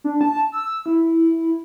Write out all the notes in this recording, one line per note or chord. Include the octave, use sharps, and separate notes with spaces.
D4
A5
E6
E4